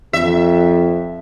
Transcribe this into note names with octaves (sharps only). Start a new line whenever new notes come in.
F2 E5